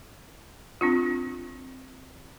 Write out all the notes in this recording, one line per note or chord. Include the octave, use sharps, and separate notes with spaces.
C4 D4 F4